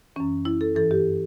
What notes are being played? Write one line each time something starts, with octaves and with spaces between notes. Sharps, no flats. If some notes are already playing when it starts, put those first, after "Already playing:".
F#2 E3 C#4
E4
A4
G2 E3 A4
G4